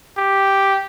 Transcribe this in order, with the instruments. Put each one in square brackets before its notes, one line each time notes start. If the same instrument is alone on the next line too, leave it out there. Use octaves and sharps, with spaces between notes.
[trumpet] G4